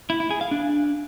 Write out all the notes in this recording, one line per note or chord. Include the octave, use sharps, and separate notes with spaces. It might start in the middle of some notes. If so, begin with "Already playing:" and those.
E4
E4
G#4
F5
D4